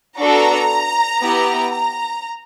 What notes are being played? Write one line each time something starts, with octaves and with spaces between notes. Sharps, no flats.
B3 D4 F#4 A4 A#5
B3 E4 G4
A#5